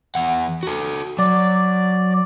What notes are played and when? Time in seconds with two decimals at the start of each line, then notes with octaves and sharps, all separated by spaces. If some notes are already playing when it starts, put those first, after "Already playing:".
0.15 E2 F#5
0.63 F#4 A4
1.19 F#3 D5